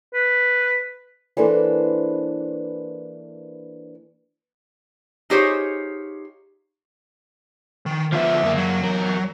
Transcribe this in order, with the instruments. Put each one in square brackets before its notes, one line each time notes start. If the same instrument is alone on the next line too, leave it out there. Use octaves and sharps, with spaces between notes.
[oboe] B4
[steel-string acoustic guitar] E3 A#3 D4 A4 B4 C5
[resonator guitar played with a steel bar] D#4 F4 G4 G#4 C5 C#5
[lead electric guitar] D#3
[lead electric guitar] D2 E5 [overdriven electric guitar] F3 B3
[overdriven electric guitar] F#2 A#3
[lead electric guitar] F#3
[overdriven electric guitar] E2 A#4